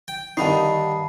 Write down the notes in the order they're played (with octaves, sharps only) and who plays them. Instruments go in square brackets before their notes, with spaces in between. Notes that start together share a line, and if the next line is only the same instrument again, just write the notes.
[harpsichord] G5
[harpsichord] G2 D3 D#3 [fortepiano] D#4 [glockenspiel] A5 B5 C7